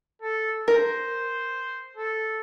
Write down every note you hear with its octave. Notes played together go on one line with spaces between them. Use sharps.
A4
A#4 C5
A4